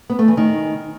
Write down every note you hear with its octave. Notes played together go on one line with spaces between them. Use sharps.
B3
A3
E3
D#3